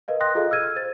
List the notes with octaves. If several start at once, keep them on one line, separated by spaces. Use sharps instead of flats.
A#4 B4 D#5 F5
G5 C6 D#6 F#6 A#6
F4 G#4 A4 D#5 F5
E6 F6 G#6 D#7
C5 A6